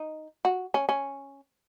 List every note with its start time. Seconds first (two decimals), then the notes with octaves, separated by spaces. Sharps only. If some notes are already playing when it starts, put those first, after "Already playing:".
Already playing: D#4
0.45 F#4
0.74 C#4
0.89 C#4